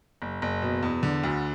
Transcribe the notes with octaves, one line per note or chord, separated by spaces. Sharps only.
F#1
F#1
B2
E2
D3
D2